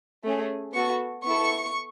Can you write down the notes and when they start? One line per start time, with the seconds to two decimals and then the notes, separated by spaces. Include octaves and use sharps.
0.24 A3 C#4 G#4
0.74 B3 F#4 A4 C#6
1.24 B3 E4 A4 C#6